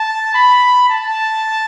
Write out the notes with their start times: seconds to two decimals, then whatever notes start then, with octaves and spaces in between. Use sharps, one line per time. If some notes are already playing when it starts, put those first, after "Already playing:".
Already playing: A5
0.34 B5
0.90 A5